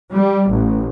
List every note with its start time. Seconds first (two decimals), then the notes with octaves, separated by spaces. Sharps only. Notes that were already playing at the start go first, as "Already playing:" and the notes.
0.14 G3
0.49 A1